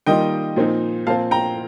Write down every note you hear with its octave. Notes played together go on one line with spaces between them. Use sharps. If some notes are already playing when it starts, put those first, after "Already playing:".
D#3 G3 A#3 F4 D#5 G5
A#2 F3 C4 D#4
A#2 F3 C4 F5 A5
G5 A#5